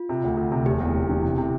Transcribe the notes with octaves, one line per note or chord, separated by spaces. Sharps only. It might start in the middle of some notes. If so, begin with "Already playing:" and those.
Already playing: F4
C3
D2
D2
C3
E1 G4
E2
E1
E3
C3
C3